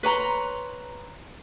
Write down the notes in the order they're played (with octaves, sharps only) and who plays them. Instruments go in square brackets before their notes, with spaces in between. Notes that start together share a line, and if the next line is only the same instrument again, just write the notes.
[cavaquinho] B4 C#5 A#5 C6